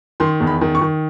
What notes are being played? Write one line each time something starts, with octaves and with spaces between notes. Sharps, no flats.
D#3 C6
E2
B5
D#3
C#6
D#3